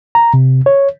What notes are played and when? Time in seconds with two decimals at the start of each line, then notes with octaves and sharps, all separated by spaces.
0.15 A#5
0.34 C3
0.66 C#5